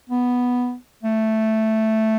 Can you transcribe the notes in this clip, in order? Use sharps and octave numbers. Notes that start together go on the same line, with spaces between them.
B3
A3